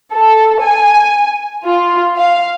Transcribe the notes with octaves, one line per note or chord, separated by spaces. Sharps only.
A4
G#5
F4
F5